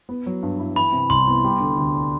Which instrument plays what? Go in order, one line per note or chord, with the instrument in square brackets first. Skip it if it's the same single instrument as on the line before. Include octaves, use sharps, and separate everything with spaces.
[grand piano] B3
F#3
G2
E4
[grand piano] E3 [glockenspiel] B5
[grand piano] C3
[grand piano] C2 [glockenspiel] C6
[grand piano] B3
G3
D3
D2
D4